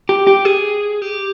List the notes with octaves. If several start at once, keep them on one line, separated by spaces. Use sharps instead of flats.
G4
G4
G#4
G4